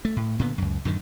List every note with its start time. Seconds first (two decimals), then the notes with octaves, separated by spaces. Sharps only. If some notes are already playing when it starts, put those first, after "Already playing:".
0.05 A3
0.17 A2
0.39 A#2 D3 B3
0.58 C#2 F#2
0.85 F#2 A2 D3 D#3